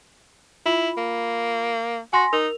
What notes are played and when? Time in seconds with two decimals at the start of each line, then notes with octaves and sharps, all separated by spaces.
0.66 E4 F4 B5
0.97 A#3
2.13 F#4 G#5 C6 A#6
2.33 D#4 A#4 F7